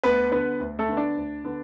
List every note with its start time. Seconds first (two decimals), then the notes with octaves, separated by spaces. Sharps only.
0.03 D2 B3 B4
0.32 D3 B3 B4
0.60 D2
0.79 A3 A4
0.88 D3 B3
0.97 D4 D5
1.16 D2
1.44 D3 B3